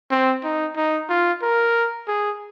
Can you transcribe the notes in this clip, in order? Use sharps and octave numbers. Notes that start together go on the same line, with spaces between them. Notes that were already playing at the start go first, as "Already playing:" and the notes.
C4
D#4
D#4
F4
A#4
G#4